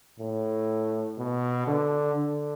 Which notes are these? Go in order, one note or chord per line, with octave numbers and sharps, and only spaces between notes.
A2
B2
D3
D3